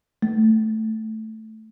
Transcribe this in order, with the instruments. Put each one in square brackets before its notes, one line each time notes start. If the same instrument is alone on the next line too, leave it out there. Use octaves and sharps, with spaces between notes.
[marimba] A3